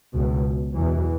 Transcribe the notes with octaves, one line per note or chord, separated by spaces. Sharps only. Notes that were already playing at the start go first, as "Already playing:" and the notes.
C#2 B2
E2 B2 E3